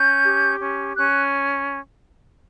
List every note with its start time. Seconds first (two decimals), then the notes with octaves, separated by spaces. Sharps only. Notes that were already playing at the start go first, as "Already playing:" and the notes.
Already playing: C#4 G6
0.23 G4
0.59 C#4
0.96 C#4 F#6